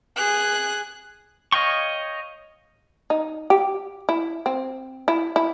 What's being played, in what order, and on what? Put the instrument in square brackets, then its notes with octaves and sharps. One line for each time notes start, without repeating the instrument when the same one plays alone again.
[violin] G#4 F#6
[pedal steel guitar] C#5 D#5 F5 G5 C#6
[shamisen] D#4
G4
E4
C4
E4
E4